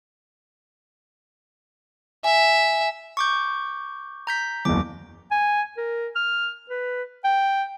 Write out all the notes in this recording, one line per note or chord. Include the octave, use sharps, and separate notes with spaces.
E5 G#5
C#6 D6 G6
A#5 G6 B6
F#1 E2 D6
G#5
A#4
F6
B4
G5